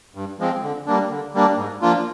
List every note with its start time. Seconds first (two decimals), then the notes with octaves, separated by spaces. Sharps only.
0.15 G2
0.39 F3 G#3 C4
0.62 D3
0.86 G3 A#3 D4
1.10 D3
1.34 G3 A#3 D4
1.58 G#2
1.81 F3 A#3 D4 F4